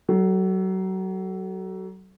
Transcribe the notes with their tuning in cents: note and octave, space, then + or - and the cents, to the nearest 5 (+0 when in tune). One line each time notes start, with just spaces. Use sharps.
F#3 +30 A4 +0